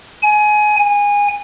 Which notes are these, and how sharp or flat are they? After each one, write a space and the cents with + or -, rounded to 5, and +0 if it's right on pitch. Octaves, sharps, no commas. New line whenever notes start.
G#5 +20
G#5 -20